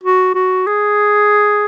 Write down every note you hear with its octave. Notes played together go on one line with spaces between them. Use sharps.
F#4
F#4
G#4